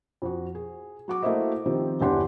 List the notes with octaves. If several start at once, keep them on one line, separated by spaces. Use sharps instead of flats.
F2 F#4
G#4
F#3 F#4 D6
A3 A#3 E4 F#4 C5 D#5
D#3 F3 C4 G4
G1 E2 D4 G4 F#5 C6